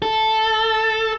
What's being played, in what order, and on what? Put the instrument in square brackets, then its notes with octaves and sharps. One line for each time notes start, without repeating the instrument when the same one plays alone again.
[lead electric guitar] A4